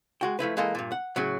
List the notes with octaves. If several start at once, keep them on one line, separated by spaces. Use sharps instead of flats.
G#3 F#4 G5
F3 A3 E4 B4
E3 G#3 A#3 A4 D#5
G2 A#2
F#5
A2 C#3 F#3